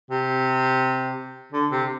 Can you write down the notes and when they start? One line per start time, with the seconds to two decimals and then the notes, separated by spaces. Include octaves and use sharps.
0.11 C3
1.52 D3
1.71 C3